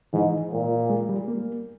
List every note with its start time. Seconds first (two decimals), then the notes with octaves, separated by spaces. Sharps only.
0.13 G#2 E3
0.52 A#2
0.90 G#3
1.09 G3
1.28 A#3